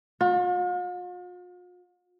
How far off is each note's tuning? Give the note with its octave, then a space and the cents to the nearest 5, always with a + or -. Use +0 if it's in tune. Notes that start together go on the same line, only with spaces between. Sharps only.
F4 +45